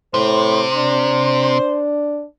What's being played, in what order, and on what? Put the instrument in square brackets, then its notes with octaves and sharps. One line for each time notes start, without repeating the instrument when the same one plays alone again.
[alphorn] A2 [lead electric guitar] C3 [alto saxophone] C5
[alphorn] D4